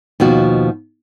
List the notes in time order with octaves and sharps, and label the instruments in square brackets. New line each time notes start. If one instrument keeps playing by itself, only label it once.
[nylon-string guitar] D#2 B2 F3 F#4